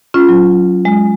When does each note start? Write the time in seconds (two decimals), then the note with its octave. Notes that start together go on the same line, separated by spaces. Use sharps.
0.14 C#4 F4
0.29 F#3
0.85 G#3